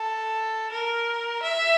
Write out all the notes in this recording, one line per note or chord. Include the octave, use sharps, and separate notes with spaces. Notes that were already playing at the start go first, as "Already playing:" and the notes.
Already playing: A4
A#4
E5